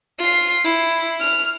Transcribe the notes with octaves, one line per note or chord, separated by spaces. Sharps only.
F4 C7
E4
F6